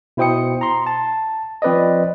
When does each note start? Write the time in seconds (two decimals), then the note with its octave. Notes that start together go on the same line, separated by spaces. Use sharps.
0.17 B2 E4 C5 G5 D#6 C#7
0.61 A#5 C6
0.87 A5
1.62 F3 C4 B4 D5 D#5